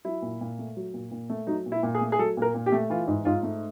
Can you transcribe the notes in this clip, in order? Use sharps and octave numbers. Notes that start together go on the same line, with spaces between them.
F#3 E4
A#2
A#2
A3
F#3
A#2
A#2
A3
F#3 D#4
A#2
E4
A#2
G#4
A3
G#4
F#3 A4
A#2 A#4
A#2
G4
A3
E3 F4
G#2
G#2 F4
A3